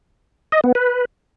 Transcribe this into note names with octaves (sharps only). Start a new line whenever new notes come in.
D#5
B3
B4